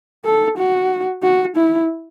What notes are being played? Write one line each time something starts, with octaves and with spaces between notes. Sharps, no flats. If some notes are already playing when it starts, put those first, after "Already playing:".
A4
F#4
F#4
E4